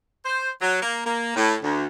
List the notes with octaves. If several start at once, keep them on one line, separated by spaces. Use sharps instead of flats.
C5
F#3
A#3
A#3
A2
D2